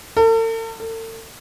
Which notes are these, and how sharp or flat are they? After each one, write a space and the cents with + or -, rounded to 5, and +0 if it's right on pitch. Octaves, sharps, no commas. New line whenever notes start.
A4 +45
A4 +40